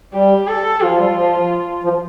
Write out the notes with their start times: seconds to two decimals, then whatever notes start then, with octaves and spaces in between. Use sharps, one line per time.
0.14 G3 G4
0.48 A4
0.81 F3 F4
0.92 F3
0.99 G3
1.15 F3
1.84 F3